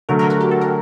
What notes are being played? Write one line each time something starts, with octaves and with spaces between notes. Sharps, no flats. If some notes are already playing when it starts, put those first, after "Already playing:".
D3 F#3 A3 A#4
A#4
F#4
G4
A4
A#4